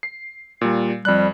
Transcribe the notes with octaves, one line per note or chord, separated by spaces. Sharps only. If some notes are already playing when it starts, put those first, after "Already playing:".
C7
A#2 G3
F2 G3 F#6